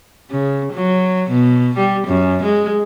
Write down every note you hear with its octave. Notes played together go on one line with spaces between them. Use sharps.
C#3
F#3
B2
G3
F#2
G#3